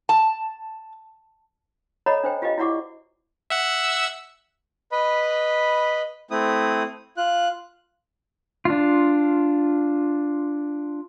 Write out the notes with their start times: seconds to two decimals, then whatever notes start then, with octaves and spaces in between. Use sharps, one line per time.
0.09 A5
2.06 A4 C#5 D#5 F#5 A#5 B5
2.23 D4 C5 G5
2.42 F4 G4 B4 D#5 F5
2.58 E4 F#4 D5 F#5 C#6 D6
3.50 E5 F#5 E6
4.92 B4 D#5 B5
6.31 A3 C4 E4 D#6
7.17 F4 F#6
8.65 D4 F4